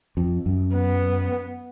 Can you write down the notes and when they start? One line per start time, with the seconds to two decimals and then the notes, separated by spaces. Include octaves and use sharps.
0.17 F2
0.46 F#2
0.74 B3